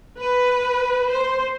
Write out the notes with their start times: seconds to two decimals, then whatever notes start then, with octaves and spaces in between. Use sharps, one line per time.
0.17 B4
1.08 C5